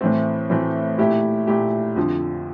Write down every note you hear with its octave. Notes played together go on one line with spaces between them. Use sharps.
A2 E3 A3 C4
A2 E3 A3 C4
A#2 A3 E4 G4
A#2 A3 E4 G4
F2 D3 F3